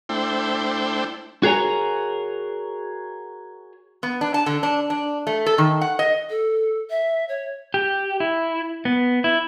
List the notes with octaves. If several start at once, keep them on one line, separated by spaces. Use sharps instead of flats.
A3 D4 E4 C5 G5
F#4 G#4 A#4 C#5 G#5
B3
D4
A5
D3
D4
D4
A3
A4
D#3
F#5
D#5
A4
E5
C#5
G4
E4
B3
E4